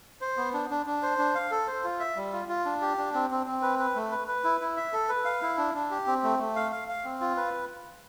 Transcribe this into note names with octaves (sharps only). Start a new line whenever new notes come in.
C5
B3
D4
D4
D4
C5
D4
F5
A4
C5
F4
E5
G3
F4
F4
D4
G4
D4
C4
C4
C4
B4
B4
A3
B4
B4
E4
E4
E5
A4
B4
F5
E4
D4
D4
G4
C4
A3
A3
F5
F5
F5
C4
F4
B4